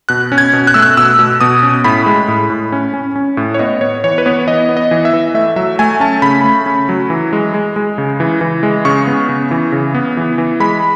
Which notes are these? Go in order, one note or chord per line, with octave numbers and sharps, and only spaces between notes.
B2 F#6
C#4
G#6
B2
F#6
A3 E6
F#6
B2 E6
B2
B2 D#6
C#4
A2 B5
G#3
A2
A2
C#4
C#4
C#4
A2
C#5
B3 D#5
B3 C#5
E3 C#5
B4
B3 C#5
E3 D#5
B3
D#5
E3
E5
E3
A3 E5
F#3 E5
A3 G#5
C#4 A5
C#3 B5
A3
C#4
F#3
E3
G#3
G#3
G#3
C#3
E3
E3
G#3
C#3 C#6
B3
C#3
E3
C#3
B3
E3
E3
G#3 B5